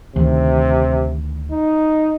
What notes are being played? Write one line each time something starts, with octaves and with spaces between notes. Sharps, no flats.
D2 C3 D#3
D#4